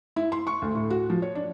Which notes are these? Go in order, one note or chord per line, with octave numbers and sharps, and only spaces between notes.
E4
C6
C#6
D2
A2
F#4
F3
C#5
D4